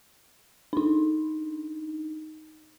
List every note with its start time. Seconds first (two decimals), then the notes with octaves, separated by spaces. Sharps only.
0.73 D4 D#4